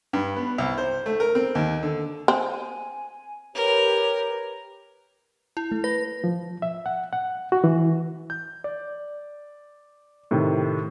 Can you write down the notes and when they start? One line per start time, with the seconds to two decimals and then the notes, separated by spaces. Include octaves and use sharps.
0.13 G2
0.36 B3
0.58 C2
0.78 C5
1.06 A3
1.20 A#4
1.35 C4
1.55 D#2
1.83 D3
2.28 C4 G#5
3.55 G4 A#4 B4 C#5
5.57 E4
5.72 A3
5.84 B4 A#6
6.24 F3
6.62 E5
6.86 F#5
7.13 F#5
7.52 F#4
7.64 E3
8.30 G6
8.64 D5
10.31 A2 C3 D#3